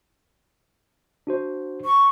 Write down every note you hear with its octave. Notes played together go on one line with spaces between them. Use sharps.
D4 F#4 C5
C#6